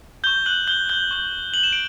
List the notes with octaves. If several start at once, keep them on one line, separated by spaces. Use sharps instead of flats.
C#6 G6 G7
F#6 F#7
G6 G7
G6 G7
C#6 G6
F#7
E7
D7